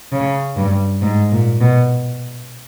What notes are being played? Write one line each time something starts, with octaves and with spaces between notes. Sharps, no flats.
C#3
G2
G#2
A#2
B2